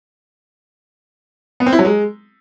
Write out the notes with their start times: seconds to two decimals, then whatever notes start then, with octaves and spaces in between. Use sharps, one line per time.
1.60 B3
1.66 C4
1.73 E4
1.79 F#3
1.85 G#3